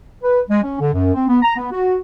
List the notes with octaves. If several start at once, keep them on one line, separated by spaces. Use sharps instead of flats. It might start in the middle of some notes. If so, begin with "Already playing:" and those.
B4
G#3
C#4
D3
F#2
C4
B3
A#5
B3
F#4